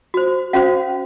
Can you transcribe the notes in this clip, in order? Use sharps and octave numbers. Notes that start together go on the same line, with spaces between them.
F#4 C5
C#4 F#4 C5 F5